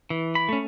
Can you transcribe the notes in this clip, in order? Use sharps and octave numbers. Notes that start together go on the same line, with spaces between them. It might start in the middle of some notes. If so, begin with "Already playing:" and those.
E3
B5
A3 C#4